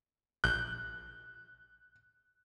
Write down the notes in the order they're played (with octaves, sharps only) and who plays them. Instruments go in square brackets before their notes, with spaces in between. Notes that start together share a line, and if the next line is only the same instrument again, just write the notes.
[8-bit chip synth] A#1 G6 [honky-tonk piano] F#6